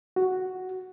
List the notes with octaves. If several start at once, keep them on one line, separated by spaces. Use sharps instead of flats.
F#4